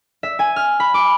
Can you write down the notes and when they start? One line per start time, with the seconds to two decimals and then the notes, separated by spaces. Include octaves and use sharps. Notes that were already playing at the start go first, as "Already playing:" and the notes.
0.23 E5
0.39 G#5
0.56 F6
0.80 B5
0.94 D6